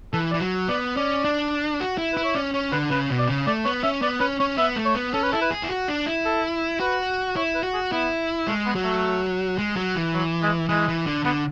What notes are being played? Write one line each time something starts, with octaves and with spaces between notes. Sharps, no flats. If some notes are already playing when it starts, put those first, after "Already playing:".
E3 A4
D5
E3
F#3
B3 D5
C#4 D5
D4
F#4
E4
E4 B4
C#5
C#4 D5
C#4 C#5
D3 B4
C#3 B4
B2
D5
C#3
A3 D5
B3 C#5
C#4 E5
B3 D5
C#4 B4
C#4 C#5
B3 E5
A3
C#5
B3
C#4 A4
B4
E4 A4
B4
G#4
E4
F#4
D4
E4
A4
F#4 B4
E4 C#5
B4
F#4
G#4
B3 E4
G#3 A3
B3
F#3
A3
G#3
F#3
E3
F#3
G#3
E3 G#3
E3
D3
D3 B3